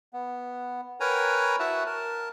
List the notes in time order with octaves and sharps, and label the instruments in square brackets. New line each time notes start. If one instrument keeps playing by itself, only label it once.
[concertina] B3
A#4 B4 C#5 G5 G#5 A#5
E4 F#4 E5 F#5 A5
A#4 A5